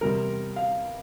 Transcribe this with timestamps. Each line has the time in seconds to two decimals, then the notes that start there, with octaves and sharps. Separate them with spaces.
0.01 E2 C3 G3 C4 A#4
0.56 F5